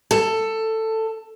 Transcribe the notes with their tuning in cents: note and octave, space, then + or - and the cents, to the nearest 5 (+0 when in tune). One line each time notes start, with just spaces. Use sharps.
A4 +10